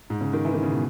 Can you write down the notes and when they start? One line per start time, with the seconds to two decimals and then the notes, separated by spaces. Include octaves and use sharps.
0.10 G#2
0.21 C#3
0.33 D#3
0.45 E3
0.54 D#3
0.63 C#3
0.72 B2